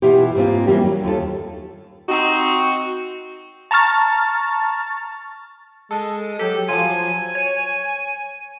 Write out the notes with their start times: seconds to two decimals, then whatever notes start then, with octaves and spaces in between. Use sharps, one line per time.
0.02 B2 E3 E4 F4 G4
0.35 G#2 A#3 C4 F4
0.67 E3 G3 A#3 D4 G4
0.84 F#3
1.03 D#2 F4 A4
2.08 C4 D#4 F#4
3.71 A5 A#5 C#6 F6 A6
5.91 G#3 A4
6.39 F#3 G4 A4
6.69 F3 F#3 F4 G#5
7.35 C#5